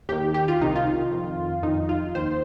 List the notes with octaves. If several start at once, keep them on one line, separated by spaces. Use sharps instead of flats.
D#2 D#3 G4
G4
F4
C2 C3 D#3 D#4
F4
F2 D#3
F2 D#3 D#4
F4
D#2 D#3 C5